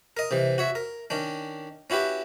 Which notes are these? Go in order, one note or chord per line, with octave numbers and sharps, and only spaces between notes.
A#4 D#5
C3 E3
F#4 C#5 E5
A#4
D#3 C#4 D4
C#4 E4 F#4 G4 B4